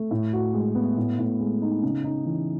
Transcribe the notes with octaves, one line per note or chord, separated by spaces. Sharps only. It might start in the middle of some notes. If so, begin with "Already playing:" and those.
Already playing: A3
A2
F#4
G#3
B3
A2
A2
G#3
D#4
C#3
D#4
E3